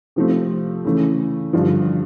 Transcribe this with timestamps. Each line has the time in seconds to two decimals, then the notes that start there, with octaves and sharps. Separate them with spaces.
0.16 C3 F3 A3 C4
0.85 C#3 E3 A3
1.53 G2 D3 F3